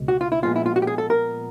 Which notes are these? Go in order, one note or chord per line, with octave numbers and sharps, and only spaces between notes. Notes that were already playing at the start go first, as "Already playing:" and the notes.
Already playing: C#2 B2 G#3
F#4
F4
E4
A#2 F3 G#3 B3 F4
E4
F4
F#4
G4
G#4
A4
A#4